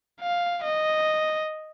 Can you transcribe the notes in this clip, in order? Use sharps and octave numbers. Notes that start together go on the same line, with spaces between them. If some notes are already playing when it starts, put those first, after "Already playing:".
F5
D#5